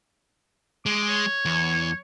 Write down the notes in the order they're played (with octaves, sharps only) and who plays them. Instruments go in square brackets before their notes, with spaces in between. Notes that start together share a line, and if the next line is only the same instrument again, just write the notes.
[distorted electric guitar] G#3 [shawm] D6
[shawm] C#5
[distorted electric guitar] E2